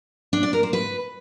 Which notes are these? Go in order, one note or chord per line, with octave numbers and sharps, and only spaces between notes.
D4
D5
A#4
C5
B4